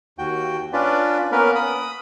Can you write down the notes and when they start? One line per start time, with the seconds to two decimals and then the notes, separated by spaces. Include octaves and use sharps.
0.19 D#2 F#4 G5
0.73 C#4 D4 F4 B4 D5
1.32 A#3 B3 C#4 A#4 B4
1.55 B5 D#6